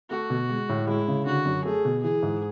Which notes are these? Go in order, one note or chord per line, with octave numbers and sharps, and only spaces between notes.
A3 F#4
B2
G#3
A2
G#3 E4
C#3
D3 F#4
F#2
A3 G#4
B2
E3 G#4
G#2